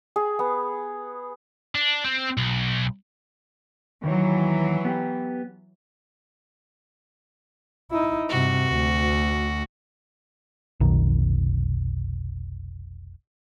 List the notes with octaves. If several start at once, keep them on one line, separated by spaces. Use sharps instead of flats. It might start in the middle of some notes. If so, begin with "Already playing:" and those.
G#4
B3
D4
C4
B1
D#2 D#3 E3 F#3 C#5
B3 G4
D#4 E4
G2 C3 F#4
D2
F1 B1 B2 D#3